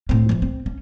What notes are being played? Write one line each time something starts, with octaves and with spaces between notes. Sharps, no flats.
A2 C4
E3 F3
C4
C#4